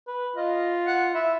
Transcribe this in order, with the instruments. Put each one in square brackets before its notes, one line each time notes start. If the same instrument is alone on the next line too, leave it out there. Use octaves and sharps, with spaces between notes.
[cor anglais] B4
[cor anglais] F4 [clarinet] D#5
[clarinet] F#5
[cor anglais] E4 [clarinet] E5